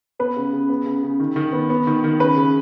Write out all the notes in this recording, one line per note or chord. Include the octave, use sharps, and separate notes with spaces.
B3 B4
C#3
C#3
B3
C#3
C#3
D#3
D#3
B3
B3
D#3
D#3
C#3 B4
C#3